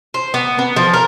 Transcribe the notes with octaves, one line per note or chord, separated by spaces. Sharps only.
C5
B3
B3
F3
A#4